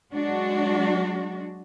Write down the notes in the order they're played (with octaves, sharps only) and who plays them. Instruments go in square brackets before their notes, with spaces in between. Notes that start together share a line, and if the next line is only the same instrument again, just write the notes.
[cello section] F#3 G#3 D4 F#4